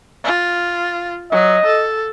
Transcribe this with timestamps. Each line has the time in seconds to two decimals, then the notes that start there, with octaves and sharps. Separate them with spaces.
0.24 F4
1.32 F#3 D#5
1.66 A4